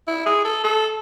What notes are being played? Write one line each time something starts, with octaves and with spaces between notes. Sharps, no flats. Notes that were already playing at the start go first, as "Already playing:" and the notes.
E4
G#4
A4
A4